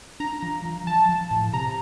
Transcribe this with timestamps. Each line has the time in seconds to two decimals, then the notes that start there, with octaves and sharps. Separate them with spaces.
0.20 D4 A#5
0.42 F3
0.65 F3
0.87 F3 A5
1.09 F3
1.31 A2
1.53 C3 A#5